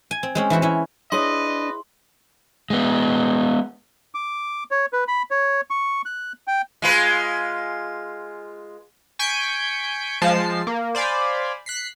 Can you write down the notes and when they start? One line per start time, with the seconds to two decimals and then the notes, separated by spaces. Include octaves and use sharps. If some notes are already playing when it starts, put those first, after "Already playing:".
0.11 G#5
0.23 C4
0.35 G#3 C4 C#4
0.50 E3 E4 F#4 C5
0.62 C#4 E4
1.12 D4 E4 G#4 B4 C#5 D#5 C6
2.70 G#3 B3
4.15 D6
4.71 C#5
4.93 B4
5.08 B5
5.31 C#5
5.70 C#6
6.06 F#6
6.47 G5
6.82 G#3 F4 B4
9.19 G#5 C#6 G6 B6 D7
10.22 F3 G#3 A5 C7
10.67 A#3
10.95 C5 D5 F5 G#5 B5
11.66 F#6 B6 C7